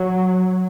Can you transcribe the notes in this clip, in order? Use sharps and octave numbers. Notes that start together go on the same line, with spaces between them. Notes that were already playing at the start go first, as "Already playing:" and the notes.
Already playing: F#3